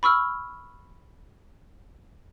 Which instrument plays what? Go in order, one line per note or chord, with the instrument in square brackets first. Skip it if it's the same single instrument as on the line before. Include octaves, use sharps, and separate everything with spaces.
[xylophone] B5 C#6 E6 F6